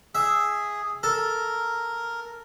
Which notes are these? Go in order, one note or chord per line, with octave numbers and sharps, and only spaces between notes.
G#4 E5
A4 A#4